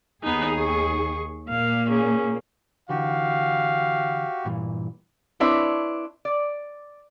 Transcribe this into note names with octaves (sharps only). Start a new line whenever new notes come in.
D#2 B3 D#4 G#4
C#6
A#2 A#3 F5
C#4 G#4
D3 E3 F#4 G4 F5
G2 A#2 E3
C4 D4 E4 B4 C#5
D5